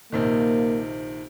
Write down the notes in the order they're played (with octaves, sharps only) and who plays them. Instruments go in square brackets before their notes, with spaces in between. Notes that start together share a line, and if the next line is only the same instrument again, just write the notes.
[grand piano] A#1 C3 D#3 [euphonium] A#3